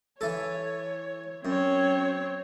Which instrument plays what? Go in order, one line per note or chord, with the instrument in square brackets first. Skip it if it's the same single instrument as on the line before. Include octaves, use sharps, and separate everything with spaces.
[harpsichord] E3 A4 [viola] C#5
[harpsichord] F#2 [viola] C4 C#5